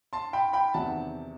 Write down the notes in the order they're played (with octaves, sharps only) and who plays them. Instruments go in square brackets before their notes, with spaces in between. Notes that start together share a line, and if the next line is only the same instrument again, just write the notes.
[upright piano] A5 C6
G5 B5
G5 B5
E2 C3 D#3 F#3 F#5 A5